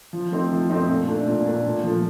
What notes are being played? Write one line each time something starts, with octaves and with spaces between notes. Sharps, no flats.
F3
A3 C4 D#4
F3
A3 C4 D#4
A#2
A3 D4
A#2
A3 D4
A#2
F3 A3